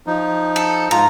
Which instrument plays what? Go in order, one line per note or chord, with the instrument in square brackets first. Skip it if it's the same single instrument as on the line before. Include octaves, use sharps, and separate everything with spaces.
[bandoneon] F3 D#4
[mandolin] A4
[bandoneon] G#2 F4 [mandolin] A#5